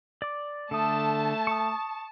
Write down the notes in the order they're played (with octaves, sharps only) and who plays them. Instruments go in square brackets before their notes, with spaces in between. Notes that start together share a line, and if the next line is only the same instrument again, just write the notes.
[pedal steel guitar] D5 D6
[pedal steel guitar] D3 D#6 [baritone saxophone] A3 [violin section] A5
[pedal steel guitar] C#6 D#6